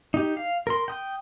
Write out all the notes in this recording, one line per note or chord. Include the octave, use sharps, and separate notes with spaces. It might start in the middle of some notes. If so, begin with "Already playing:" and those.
D#4 G4
F5
A#4 C6
G5 D#6